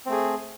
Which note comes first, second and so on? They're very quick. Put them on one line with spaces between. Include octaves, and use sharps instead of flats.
C4 A3 G#4